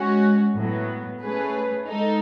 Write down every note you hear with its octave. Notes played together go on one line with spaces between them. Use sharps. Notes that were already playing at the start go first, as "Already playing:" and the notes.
Already playing: G#3 C#4 F#4
A2 F#3 B3
A3 C#4 G#4 B4
G#3 D#4 A4